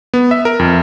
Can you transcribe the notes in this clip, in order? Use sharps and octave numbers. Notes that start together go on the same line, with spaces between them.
B3
E5
A#4
F2